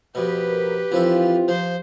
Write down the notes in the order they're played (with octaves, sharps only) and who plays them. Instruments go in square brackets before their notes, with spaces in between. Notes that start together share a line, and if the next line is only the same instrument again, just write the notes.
[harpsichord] F2 B2 [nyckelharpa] G4 B4
[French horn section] A#4
[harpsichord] E3 F3 A4 [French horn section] C4 E4 F4
[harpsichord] F3 [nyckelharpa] C5